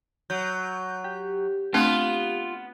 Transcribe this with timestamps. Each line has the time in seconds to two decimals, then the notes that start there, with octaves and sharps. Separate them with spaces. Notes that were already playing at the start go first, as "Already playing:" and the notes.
0.30 F#3 G6
1.04 G4
1.74 A3 B3 C4 D4 F4